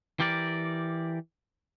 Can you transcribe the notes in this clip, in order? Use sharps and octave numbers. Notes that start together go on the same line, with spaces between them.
E3 G4 A#4 D5